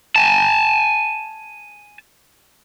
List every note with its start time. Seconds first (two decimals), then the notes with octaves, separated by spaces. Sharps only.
0.16 G#5 A5